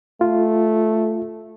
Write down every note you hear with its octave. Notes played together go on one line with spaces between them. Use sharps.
A3 F4